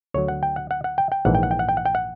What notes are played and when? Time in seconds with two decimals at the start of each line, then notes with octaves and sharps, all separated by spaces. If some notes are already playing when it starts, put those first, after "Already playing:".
0.14 D2 D3 F#3 C#5
0.28 F#5
0.43 G5
0.56 F#5
0.71 F#5
0.84 F#5
0.98 G5
1.12 G5
1.25 A#1 G#2 E3 F#5
1.35 G5
1.43 F#5
1.51 G5
1.59 F#5
1.69 G5
1.77 F#5
1.86 G5
1.95 F#5